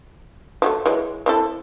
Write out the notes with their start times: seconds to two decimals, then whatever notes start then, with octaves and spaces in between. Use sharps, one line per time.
0.62 F3 F#3 A3
0.86 E3 F#3 G#3
1.26 C4 E4 A4